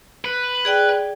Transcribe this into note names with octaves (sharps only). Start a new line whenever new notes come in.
B4
G#4 D5 G5